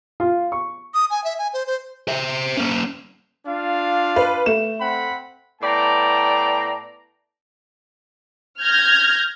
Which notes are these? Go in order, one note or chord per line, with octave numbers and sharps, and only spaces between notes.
F4
C#6
D#6
G#5
E5
G#5
C5
C5
C5 E5
A#3 C#4
D4 F4 F5
B4
A3 E7
C4 F#5 B5
A2 B3 D5 G5 A5 A#5
F6 G6 G#6 A#6